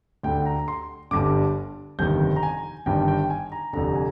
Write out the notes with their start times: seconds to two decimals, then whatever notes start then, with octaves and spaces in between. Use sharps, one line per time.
0.23 D2 D3 G5
0.46 A#5
0.68 C6
1.11 G1 G2 D3 D6
1.99 G1 F2 C3 D#3 G6
2.36 A#5
2.43 G#5
2.86 G1 G2 D#3 G5
3.08 G5
3.30 G#5
3.52 A#5
3.73 F1 F2 D3 A#5
3.95 G#5